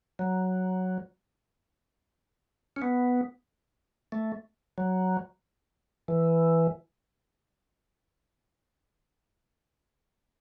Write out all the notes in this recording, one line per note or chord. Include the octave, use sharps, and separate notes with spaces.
F#3
C#4
B3
A3
F#3
E3